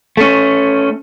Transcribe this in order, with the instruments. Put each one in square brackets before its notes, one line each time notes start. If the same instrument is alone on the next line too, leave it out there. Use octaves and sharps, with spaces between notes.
[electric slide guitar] A3 C#4